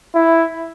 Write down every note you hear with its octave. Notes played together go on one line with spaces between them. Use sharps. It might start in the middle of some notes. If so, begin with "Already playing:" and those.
E4